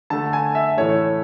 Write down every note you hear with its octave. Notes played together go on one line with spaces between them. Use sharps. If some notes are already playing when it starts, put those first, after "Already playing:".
D3 A3 A5
G#5
E5
A2 E3 A3 C#5